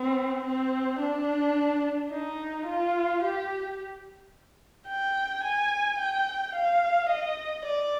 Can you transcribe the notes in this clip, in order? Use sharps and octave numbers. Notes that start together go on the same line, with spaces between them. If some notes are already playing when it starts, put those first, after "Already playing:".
Already playing: C4
C4
D4
D#4
F4
G4
G5
G#5
G5
F5
D#5
D5